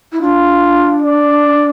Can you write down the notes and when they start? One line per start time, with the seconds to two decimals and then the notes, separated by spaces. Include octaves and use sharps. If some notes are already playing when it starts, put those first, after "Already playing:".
0.12 E4
0.21 D4 F4
1.02 D5